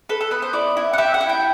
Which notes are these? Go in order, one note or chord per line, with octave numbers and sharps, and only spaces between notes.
A4 B4
A4
B3 B4
C5
E4 D5
E4
F#5
G4 E5
F#5
E4
G5